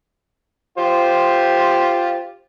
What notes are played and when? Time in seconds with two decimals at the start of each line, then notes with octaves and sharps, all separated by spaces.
0.78 F4 G4 C5